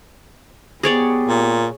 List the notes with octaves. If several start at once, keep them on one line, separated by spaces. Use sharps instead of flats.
B3 G4 G#4 C#5 D5
A#2